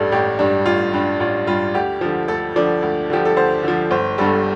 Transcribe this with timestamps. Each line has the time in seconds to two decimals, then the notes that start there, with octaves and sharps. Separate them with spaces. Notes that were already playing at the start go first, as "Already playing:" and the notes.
Already playing: A1 G2 G3 A4
0.12 A1 G4
0.39 G2 G3 D4
0.66 A1 F4
0.93 G2 G3 D4
1.20 A1 F4
1.47 G2 G3 F4
1.74 D2 G4
2.01 D3 F3
2.28 D2 A4
2.56 D3 F3 D5
2.82 D2
3.10 D3 F3 G4
3.25 A4
3.36 D2 C5
3.63 D3 F3
3.91 G1 C5
4.18 G2 D3 G3 A4